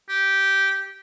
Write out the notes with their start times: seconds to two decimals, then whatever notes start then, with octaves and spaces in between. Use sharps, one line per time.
0.09 G4